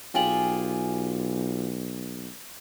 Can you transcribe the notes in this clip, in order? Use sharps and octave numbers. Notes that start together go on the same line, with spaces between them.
B1 F4 G4 G#4 G5 G#5 F#7